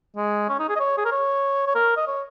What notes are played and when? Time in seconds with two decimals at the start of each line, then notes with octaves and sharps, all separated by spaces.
0.16 G#3
0.49 C#4
0.59 D#4
0.69 G#4
0.76 D#5
0.80 C#5
0.98 G#4
1.05 A#4
1.12 C#5
1.66 C#5
1.75 A#4
1.97 D#5
2.07 C#5